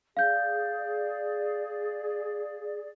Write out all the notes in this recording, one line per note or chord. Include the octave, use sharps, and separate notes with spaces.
G#4 D5 F5 G6